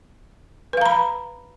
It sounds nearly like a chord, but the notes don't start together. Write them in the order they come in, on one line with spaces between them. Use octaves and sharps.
B4 F5 A#5 B5